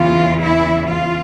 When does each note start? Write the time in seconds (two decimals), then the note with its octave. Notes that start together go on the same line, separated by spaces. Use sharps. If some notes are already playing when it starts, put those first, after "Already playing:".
Already playing: E2 C#3 E3 F4
0.40 E4
0.86 F4